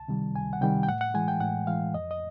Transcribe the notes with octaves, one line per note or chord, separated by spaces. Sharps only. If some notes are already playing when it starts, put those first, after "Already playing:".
Already playing: C#2 A5
C3 D#3 G3
C#2 G#5
F#5
C3 D#3 G3 G5
G5
A2 F#5
F#5
E3 G#3 G#5
G5
A2 F#5
E3 G#3 F5
F2 D#5
D#5